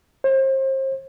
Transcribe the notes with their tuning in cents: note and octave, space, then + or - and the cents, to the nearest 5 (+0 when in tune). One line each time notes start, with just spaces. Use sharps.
C5 +35